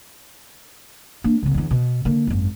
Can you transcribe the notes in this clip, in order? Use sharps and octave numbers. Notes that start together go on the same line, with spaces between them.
A#3 D4
C2 C#3
E2 D3
B2
D3 A#3
G#1 F#2